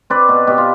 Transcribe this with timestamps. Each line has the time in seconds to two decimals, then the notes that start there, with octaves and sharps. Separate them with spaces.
0.10 C4 B4 D5
0.29 B2
0.47 B2 G4
0.58 F4